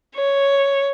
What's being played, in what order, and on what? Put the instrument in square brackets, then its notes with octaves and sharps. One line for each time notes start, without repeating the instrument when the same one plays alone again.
[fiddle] C#5